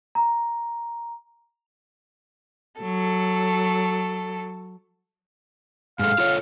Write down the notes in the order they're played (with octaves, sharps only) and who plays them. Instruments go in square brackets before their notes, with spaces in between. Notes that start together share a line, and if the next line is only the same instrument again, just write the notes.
[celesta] A#5
[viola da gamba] F#3 [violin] A4
[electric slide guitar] G#2 G#3 A4 [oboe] F5
[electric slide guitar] F4 A4 C#5